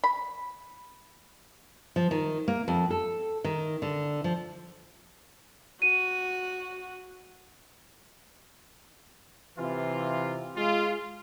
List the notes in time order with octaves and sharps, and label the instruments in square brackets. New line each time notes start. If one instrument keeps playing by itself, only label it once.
[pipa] B5
[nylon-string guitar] F3
D#3
A#3
F2
A4
D#3
D3
F3
[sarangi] F#4 [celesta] D#7
[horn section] C3 E3 F4
G#3 F4